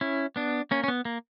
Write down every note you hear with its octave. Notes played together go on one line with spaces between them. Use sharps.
C#4 E4
B3 D4
A#3 C#4
C#4
B3
A#3